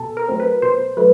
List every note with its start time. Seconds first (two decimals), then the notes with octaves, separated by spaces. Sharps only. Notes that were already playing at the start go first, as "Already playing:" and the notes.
Already playing: B2 A4
0.17 A#4
0.28 F#3 A3 C4
0.40 B4
0.62 B2 C5
0.97 F#3 A3 B4